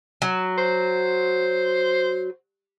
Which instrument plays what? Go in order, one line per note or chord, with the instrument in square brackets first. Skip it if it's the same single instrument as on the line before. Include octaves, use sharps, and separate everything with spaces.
[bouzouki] F#3
[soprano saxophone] C5